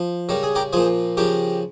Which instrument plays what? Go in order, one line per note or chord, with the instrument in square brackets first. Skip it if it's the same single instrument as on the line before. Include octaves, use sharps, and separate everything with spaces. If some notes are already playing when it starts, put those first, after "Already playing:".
Already playing: [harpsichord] F3
C#3 G3 A#4
G#4
G4 A#4
A#2 F3 G#4 C5
C#3 F3 G4 A#4